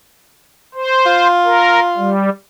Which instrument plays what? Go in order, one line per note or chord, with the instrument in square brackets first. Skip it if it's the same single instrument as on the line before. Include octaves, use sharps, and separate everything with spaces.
[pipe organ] C5
[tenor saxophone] F4
[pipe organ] A#4
G3